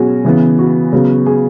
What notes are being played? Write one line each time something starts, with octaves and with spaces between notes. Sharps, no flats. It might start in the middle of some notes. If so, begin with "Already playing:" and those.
Already playing: B2 F#3 C#4 F#4 G#4
C#3 E3 B3
F#4
C#3 F#3 B3
G#4